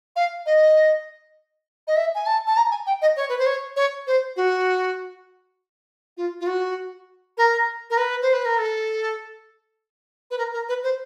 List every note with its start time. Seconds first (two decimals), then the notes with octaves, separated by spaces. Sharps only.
0.16 F5
0.46 D#5
1.87 D#5
1.96 E5
2.15 G#5
2.26 A5
2.47 A5
2.57 A#5
2.71 G#5
2.86 G5
3.02 D#5
3.16 C#5
3.29 B4
3.38 C5
3.46 C#5
3.76 C#5
4.07 C5
4.36 F#4
6.17 F4
6.40 F4
6.47 F#4
7.37 A#4
7.90 A#4
7.97 B4
8.22 C5
8.33 B4
8.45 A#4
8.58 A4
10.31 B4
10.38 A#4
10.53 A#4
10.69 B4
10.83 C5